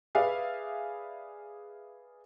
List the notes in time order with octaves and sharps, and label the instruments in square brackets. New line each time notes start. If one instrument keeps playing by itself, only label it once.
[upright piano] G#4 B4 D5 E5 F5 G#5